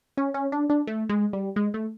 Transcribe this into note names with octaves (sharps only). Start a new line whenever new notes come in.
C#4
C#4
D4
D4
A3
G#3
G3
G#3
A3